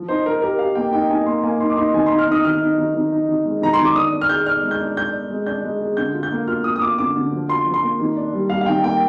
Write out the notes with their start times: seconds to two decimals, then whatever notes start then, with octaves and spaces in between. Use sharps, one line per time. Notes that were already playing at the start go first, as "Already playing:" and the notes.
Already playing: F3
0.08 D#4 C5
0.26 D#4 A#4
0.42 G4 A#4
0.59 G4 F5
0.75 A#3 G5
0.92 D#4 G5
1.10 D#4 G#5
1.26 A#3 C6
1.44 A#3 G#5
1.60 D#4 C6
1.70 D6
1.77 D#4 C6
1.93 D#3 G#5
2.06 D#4 C6
2.19 F6
2.28 D#4 D#6
2.44 D#3 F6
2.61 D#4
2.78 D#3
2.95 D#3
3.12 D#4
3.29 D#3
3.45 G#3
3.62 D#3 A#5
3.73 C6
3.79 D#3
3.85 D6
3.95 D4 D#6
4.12 D4
4.21 F6
4.29 G#4 G6
4.46 D5 F6
4.63 G#3
4.71 G6
4.80 D4
4.97 D4 G6
5.13 D5
5.30 G#3
5.46 D4 G6
5.64 G#3
5.81 G#4
5.97 D3 G6
6.14 F4
6.23 G6
6.31 A#3
6.48 F4 F6
6.64 F4 D#6
6.76 D#6
6.81 F4 D6
6.98 D3 D6
7.16 D3
7.31 F3
7.48 F4 C6
7.66 F3
7.74 C6
7.83 A#3
7.99 D#3
8.17 D4
8.33 G3
8.50 G3 F5
8.61 F5
8.66 D#3 G5
8.83 A#3 G5